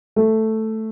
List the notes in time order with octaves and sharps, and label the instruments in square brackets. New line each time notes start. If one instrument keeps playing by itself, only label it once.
[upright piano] A3